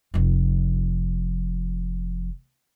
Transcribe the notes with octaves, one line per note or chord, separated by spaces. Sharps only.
F1 F3